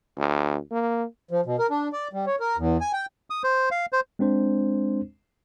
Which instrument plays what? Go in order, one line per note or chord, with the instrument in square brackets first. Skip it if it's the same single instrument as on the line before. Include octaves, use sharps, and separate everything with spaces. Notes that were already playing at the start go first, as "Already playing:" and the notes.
[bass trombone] D2
A#3
[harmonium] F3
B2
A#4
D4
D5
G3
C#5
A#4
E2
G#5
G5
[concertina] D#6
C5
F5
C5
[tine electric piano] G#3 C4 D4 C5